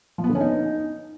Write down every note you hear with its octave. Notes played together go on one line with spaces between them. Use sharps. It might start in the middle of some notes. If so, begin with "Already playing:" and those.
F3
B3
D3
C#4
D#4